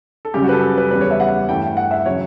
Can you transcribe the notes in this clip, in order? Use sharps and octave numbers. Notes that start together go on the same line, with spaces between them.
A4
F#2 C#3 G3 G4
F#4
B4
A4
A4
B4
E2 C#3 G3 B4
C#5
E5
F#5
G2 E3 A3 G5
G5
F#5
E5
C#3 F#3 C#5